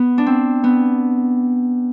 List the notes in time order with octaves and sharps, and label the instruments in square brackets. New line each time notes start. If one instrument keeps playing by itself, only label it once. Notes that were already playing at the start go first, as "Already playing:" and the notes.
Already playing: [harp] B3
D4
C4
B3